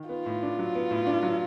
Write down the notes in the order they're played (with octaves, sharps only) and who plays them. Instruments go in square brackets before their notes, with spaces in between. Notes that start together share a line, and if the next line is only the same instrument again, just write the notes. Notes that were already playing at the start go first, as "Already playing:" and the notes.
Already playing: [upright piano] D#3
[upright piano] B3 [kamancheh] F4
[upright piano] A2
D4
F#3
B3
A2
D4
F#3